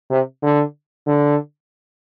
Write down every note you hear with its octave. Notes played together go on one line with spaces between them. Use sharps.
C3
D3
D3